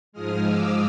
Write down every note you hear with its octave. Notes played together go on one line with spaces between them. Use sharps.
G#2 F3 G#3 D#6 F6
D6 E6